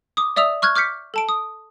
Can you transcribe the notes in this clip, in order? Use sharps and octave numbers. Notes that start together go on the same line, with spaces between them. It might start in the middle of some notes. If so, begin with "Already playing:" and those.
D6 D#6
D5 E5 D#6 E6 F7
C#6 F6 F#6 G#6
D6 F6 G6 B6 C#7
A4 A5 D7
D#6